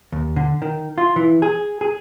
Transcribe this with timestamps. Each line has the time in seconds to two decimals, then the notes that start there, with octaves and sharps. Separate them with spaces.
0.12 D#2
0.36 D3
0.62 D#3
0.98 F4
1.16 E3
1.42 G#4
1.81 G#4